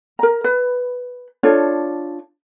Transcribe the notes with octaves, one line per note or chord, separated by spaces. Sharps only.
A#4 A#5
B4
D4 F4 A4 C#5